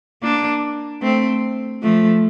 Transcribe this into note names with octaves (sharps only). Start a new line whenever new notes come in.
A#3 D4
A3 C4
F3 A3